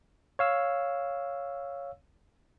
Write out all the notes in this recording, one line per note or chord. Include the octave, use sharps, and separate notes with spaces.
C#5 F5 E6